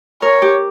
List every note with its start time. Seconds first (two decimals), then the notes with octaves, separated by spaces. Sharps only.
0.22 A#4 C#5
0.42 G4